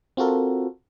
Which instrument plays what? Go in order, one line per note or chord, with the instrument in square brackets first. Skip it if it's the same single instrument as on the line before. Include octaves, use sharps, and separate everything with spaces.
[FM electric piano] C4 F4 F#4 A4 A#4